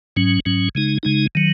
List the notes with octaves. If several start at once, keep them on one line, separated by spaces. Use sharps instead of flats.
G#2 F#3 C#4
G#2 F#3 C#4
C#3 G#3 D#4
C#3 G#3 D#4
D#3 F#3